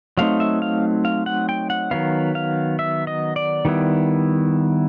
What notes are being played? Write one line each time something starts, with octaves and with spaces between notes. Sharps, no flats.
F#3 A3 C4 D#4 F5
E5
F5
F5
F#5
G5
F#5
D#3 F#3 B3 F5
F5
E5
D#5
D5
D#3 G3 B3 E4